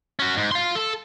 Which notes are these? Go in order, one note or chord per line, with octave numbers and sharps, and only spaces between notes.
C#4 F#4
G#2
F5 C6
A4